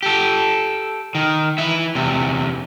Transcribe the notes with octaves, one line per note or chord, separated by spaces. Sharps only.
G4 A4
D#3
E3 E5
E2 C3